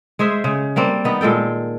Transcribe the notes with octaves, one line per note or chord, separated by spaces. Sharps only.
G#3 G#4 C5 E5
C#3
G3 A#3 C4
D#3 B3 D#4
A#2 G#3 A4 G5